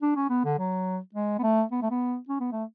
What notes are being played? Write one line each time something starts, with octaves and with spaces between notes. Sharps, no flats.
D4
C#4
B3
D3
F#3
G#3
B3
A3
B3
A3
B3
C#4
B3
A3